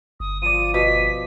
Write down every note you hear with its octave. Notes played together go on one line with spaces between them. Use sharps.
G1 D#6
F3 D5 D#7
B2 B6